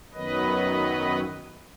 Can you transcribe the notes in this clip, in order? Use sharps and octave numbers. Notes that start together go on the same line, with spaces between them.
F#2 D#3 F#3 B3 B4 D#5